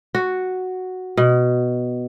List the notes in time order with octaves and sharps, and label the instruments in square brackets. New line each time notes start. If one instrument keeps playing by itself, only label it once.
[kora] F#4
B2